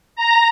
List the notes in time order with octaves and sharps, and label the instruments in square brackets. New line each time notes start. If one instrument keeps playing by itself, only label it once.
[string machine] A#5